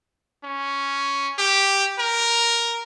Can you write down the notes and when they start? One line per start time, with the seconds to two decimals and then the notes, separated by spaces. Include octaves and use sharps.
0.44 C#4
1.38 G4
1.99 A#4